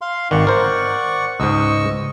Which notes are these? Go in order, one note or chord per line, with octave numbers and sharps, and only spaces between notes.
F5 C6
G#1 D#3 D5 F#5 C#6
A#4 C5
C#2 G#2 D#5 C#6 E6